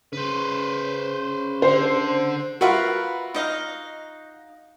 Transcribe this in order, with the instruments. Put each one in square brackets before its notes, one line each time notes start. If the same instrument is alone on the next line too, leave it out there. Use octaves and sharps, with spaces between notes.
[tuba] C#3 [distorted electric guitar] B4 C5
[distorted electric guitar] D3 [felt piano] C5
[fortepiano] F4 F#4 [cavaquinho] A#4 B4 E5
[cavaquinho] D#4 D#5 F5